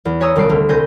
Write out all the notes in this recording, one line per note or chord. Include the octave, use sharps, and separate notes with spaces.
E2
B4 C#5 G#5 A#5 D#6 E6
D#1 C2 G3 A5 C7 D7
D2 G3 A3
C2 C5 G#5 G6 A#6